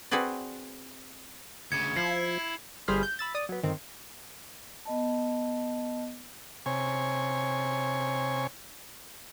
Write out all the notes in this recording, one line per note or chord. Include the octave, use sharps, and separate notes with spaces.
C4 F#4 G#4 B4 D5
D2 C#3 G#6 C#7
F3 E4 C7
G1 G3 G#4 C5 B5 F6
G6
B5 E6 A6
D5 D#6
F#3 B3
G1 D#3 C4
B3 D#5 A5
C3 C#5 G#5